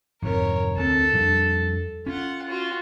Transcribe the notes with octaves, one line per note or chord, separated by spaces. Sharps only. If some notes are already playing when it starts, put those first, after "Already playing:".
F2 G#2 C3 A#4 C#5
D2 C4 A4
F2 G3 D4
C#4 F4 F#5
F4 F#4